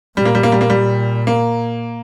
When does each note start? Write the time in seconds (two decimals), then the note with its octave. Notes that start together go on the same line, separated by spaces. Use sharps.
0.17 A#2 G3
0.25 A#3
0.35 G3
0.43 A#3
0.52 G3
0.61 A#3
0.70 G3
1.27 A#3